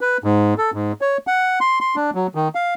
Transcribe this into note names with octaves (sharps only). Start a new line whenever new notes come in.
B4
G#2
A4
G#2
C#5
F#5
C6
C6
D4
F#3
D#3
F5